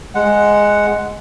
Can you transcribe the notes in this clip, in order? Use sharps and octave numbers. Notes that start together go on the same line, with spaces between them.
G#3 F#5